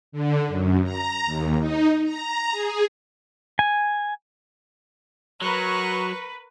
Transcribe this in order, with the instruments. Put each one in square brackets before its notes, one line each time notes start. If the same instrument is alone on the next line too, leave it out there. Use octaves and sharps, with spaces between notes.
[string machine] D3
F#2
A#5
D#2
D#4
A#5
G#4
[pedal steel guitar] G#5
[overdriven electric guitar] F#3 [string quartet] A#4 C#6 F#6 [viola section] B4